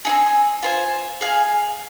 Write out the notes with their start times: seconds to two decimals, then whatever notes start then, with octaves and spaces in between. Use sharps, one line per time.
0.05 D#4 G#4
0.09 C4
0.63 F4 C5 G#5
1.21 G#4 F5 G#5